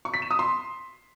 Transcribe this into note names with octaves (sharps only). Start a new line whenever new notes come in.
C#6
B6
E7
D#6
C6